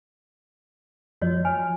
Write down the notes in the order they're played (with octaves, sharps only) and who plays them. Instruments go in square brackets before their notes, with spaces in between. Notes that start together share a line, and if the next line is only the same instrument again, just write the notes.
[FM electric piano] F#2 F3 [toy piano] F#4 C#5 D#5
[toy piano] G#5 [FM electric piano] F6